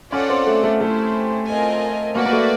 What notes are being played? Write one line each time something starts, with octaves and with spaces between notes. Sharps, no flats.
C#4 F4 A4 D5 F#5
C4
A3
A3
A3 E4 G4 C5
C4 F4 A#4 D#5 G#5
A#3 F#4 B4 D5
A#3
A3